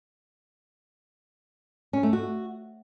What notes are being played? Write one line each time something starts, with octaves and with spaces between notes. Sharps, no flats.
C#4
A3
F#4